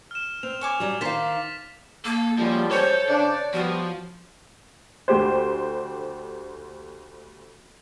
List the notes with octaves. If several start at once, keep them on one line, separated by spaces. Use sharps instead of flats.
F6 E7
C4 F7
C#5 G#5 D6
F#3 G3
D#3 C5 D5 F5 A6 B6
A#3 A4
F#2 F3 G3 G#3
A4 C5 C#5
C#3 D4 D5
F3 G3 B3 F#4
D2 G4 C5